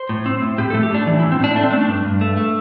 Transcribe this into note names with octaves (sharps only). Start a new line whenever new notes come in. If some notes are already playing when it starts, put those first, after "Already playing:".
Already playing: C5
A2
C4
A2
A2 G4
A3 A4
G4
A2 D4
E3 D4
A2 E4
C4
A2 D4
A3 D4
C4
A3 D4
D4
G2
G2
A3
A3